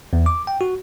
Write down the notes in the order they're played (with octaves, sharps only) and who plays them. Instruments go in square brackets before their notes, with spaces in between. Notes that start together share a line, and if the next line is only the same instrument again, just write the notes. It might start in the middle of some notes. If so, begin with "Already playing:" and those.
[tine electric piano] E2
D6
G5
F#4